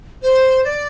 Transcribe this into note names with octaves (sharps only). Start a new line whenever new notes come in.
C5
D5